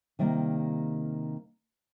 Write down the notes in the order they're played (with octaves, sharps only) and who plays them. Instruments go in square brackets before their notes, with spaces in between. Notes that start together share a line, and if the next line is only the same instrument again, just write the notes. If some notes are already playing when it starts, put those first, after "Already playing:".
[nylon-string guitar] C3 D#3 G3 A#3